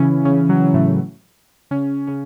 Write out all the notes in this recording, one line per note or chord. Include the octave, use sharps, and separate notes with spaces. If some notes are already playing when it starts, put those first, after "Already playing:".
Already playing: C#3 E3 C#4 E4
C#3 C#4
F#3
A2 A3
C#3 C#4
C#3 C#4